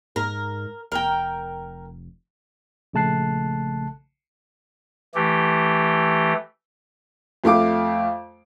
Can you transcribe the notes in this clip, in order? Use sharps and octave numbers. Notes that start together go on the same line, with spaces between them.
G#2 A#4
F1 A#4 G5
A#1 C#3 A3 A5 F#6 C7
E3 A3 G4
F2 A3 F5 D6